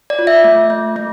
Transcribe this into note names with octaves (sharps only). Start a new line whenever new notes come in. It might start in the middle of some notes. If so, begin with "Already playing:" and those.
D5
F4
E5
A3
A3
A3